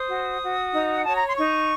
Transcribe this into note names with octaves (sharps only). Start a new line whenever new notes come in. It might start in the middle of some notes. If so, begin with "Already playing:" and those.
Already playing: C5 D#6
F#4
F#4
D#4
F#5
C#5 A5
A#5
C6
D#4 C#6